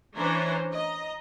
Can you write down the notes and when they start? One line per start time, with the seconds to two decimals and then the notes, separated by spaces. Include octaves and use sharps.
0.15 E3 C#4 D4 C5 C#5 A#5
0.72 D#5 A#5